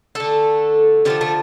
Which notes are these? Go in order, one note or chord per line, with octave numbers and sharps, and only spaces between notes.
D3 A3 A4
D3 F3 A3 G4
A3